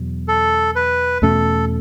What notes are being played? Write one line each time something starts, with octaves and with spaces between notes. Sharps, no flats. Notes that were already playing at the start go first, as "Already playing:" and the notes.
Already playing: E2 B2 F#3
A4
B4
E2 B2 A3 C#4 A4